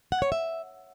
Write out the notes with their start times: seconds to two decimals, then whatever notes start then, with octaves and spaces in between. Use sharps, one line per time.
0.12 F#5
0.22 C#5
0.32 E5